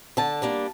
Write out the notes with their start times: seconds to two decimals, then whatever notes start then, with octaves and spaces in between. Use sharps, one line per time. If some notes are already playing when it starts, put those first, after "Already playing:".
0.17 D3 A5
0.42 G3 A#3 D4